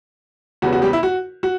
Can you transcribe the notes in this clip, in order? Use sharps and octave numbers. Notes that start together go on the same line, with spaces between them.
E2 C#3 G3 B3 F#4
F#4
G3 G4
E4
F#4
F#4